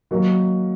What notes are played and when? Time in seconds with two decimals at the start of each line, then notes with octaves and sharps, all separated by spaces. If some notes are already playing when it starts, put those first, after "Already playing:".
0.11 D#3 F#3 A#3